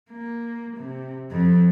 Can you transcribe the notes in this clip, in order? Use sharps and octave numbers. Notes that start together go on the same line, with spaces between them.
A#3
C3
F2